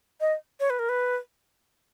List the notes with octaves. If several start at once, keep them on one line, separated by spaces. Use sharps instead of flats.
D#5
C#5
B4
A#4
B4